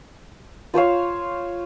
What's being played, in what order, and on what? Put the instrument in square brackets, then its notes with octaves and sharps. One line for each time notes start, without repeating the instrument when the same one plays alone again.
[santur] F4 C5 C#5 F5